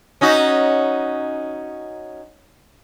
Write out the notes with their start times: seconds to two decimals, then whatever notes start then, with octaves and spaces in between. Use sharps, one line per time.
0.21 C#4 D#4 F#4